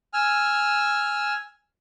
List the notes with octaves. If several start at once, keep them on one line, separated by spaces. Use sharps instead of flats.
G#5 E6 F6